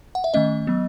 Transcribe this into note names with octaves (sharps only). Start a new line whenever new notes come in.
F#5
E5
D#3 A3 C#4 D#5
F#3 B3